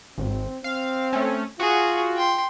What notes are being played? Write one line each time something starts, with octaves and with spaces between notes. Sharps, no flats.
G#1 C4
C4 F5
A3 C#4
F4 F#4 G#4
G5 C6